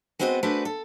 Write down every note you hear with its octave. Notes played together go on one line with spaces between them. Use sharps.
G#3 B3 C4 F#4 C5 D#5
A3 D4 F#4 G#4 B4 C5
A4